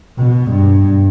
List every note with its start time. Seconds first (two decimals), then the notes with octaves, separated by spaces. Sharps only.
0.18 B2
0.51 G2